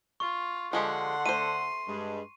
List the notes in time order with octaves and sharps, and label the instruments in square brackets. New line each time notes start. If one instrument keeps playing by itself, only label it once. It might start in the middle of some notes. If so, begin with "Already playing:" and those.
[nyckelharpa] F4 [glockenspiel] C#6
[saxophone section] D3 F#5 [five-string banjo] F3 G#3 G4 [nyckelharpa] C6
[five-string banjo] A3 C5 [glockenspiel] D#7
[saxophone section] G2 G#3